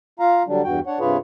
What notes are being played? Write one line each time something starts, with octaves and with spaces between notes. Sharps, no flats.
F4 F5 A#5
D3 F#3 G3 D4
E2 G2 F#4 G5
D4 C#5 F#5
G2 C3 F4 G#4 B4 C#5